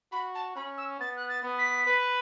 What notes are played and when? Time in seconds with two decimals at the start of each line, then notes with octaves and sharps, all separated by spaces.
0.12 F#4 B5
0.35 A5
0.55 C#4 B5
0.77 E6
0.99 B3 A6
1.16 F#6
1.28 A6
1.43 B3
1.58 B6
1.86 B4